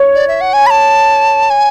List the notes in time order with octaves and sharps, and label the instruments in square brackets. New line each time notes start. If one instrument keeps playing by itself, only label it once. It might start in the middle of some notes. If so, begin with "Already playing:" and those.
Already playing: [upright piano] C#5
[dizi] D5
E5
F#5
G#5
B5
A5
G#5